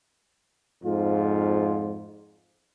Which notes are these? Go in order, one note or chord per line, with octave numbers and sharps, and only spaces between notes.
F2 G#2 F4